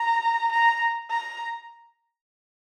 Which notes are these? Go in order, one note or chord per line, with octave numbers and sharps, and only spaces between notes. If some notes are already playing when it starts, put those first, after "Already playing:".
Already playing: A#5
A#5
A#5